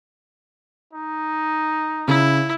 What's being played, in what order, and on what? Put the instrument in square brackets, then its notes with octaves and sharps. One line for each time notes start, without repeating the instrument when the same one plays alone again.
[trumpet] D#4
[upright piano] C#3 [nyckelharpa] E4